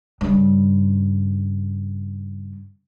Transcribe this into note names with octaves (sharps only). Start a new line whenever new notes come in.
G2 C#3